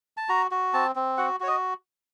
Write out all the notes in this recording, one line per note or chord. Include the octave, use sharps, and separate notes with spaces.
A5
F#4 A#5
F#4
C4 A5
C4
F#4 F#5
F#4 C#5
D#5